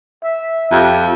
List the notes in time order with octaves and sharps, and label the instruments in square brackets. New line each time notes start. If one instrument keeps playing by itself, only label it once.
[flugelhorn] E5
[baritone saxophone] F2 [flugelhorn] G4